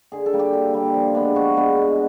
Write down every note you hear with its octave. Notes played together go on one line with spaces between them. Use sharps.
D3 G#4
A4
G3 A#3
G4
D3
G3 A#3
F3
G#3 B3 D4
F3 F#4
G#3 B3 D4
B2